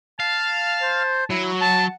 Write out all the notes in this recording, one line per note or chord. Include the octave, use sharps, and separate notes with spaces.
F5 A5
C5
F#3 E4
F#5 A5